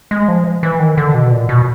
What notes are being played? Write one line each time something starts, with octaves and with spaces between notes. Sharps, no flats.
G#3
F3
E3
D#3
D3
B2
A#2
B2